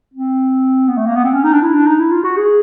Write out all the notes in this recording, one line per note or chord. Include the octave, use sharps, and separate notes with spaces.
C4
B3
A3
A#3
B3
C4
C#4
D#4
D4
E4
D4
D#4
E4
F4
F#4
G#4